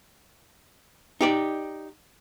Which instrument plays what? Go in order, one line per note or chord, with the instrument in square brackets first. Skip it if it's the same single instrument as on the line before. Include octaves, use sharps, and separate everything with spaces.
[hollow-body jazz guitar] D#4 G4 D5